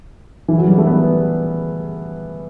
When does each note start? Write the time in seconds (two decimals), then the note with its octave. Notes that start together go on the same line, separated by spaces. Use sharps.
0.48 E3
0.58 F#3
0.67 G3
0.78 A3
0.87 B3